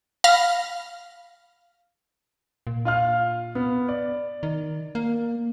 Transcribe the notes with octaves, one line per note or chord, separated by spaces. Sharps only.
F5 B5 F6 A#6
A#2
F4 F5 F6
B3
D5
D#3
A#3